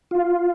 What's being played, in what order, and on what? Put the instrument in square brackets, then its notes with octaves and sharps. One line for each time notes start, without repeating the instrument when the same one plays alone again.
[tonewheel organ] F4